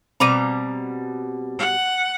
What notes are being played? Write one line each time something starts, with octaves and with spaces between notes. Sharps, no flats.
B2 G3 C4 A#5 B5 D6 D#7
F#5